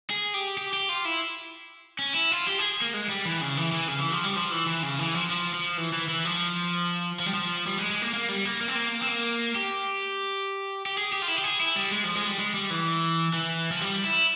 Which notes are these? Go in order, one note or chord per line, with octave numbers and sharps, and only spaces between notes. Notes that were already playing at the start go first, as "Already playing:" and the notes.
G#4
G4
G4
G4
F4
E4
C#4
E4
F4
G4
G#4
A#3
G#3
G3
E3
C#3
E3
E3
C#3
E3
F3
G3
F3
E3
E3
C#3
E3
F3
F3
F3
E3
E3
E3
F3
F3
G3
F3
G3
G#3
G#3
A#3
A#3
G3
A#3
A#3
C4
A#3
C4
A#3
G4
G4
G#4
G4
F4
E4
G4
G#4
E4
G3
G#3
F3
G#3
G3
G#3
G3
E3
E3
F3
G3
E4